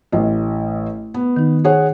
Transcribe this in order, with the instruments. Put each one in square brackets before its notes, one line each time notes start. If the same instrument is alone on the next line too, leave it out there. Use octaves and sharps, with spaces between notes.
[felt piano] A1 D#5 [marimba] A3
[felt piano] B3
[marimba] D#3 D#4
[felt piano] G#4 C#5 F#5